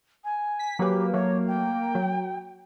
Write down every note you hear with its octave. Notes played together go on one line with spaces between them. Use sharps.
G#5
B6
F#3 A#3 G4 B4
F#3 A3 C#5
G5
F#3